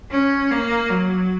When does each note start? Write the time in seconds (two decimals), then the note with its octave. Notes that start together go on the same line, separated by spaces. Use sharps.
0.11 C#4
0.51 A#3
0.90 F#3